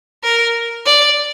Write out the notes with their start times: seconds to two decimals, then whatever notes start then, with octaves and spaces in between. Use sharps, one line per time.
0.24 A#4
0.86 D5